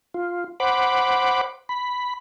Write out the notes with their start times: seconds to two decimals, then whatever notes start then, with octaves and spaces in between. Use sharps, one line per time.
0.14 F4
0.60 C5 F#5 B5 D6
1.69 B5